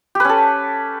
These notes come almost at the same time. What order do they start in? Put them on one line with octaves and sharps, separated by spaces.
G4 B4 C#4 A4